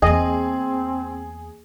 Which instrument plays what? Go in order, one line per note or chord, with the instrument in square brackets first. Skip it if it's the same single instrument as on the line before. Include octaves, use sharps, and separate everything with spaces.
[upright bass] E2 A#3 [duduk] C4 [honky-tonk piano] G#4 [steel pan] D#5